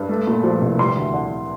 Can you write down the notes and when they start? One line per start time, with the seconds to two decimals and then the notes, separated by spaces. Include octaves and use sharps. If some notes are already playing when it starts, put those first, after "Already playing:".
Already playing: G2
0.09 A3
0.27 A#2
0.44 F3
0.62 C2
0.78 G3 C6
0.96 D2
1.14 D3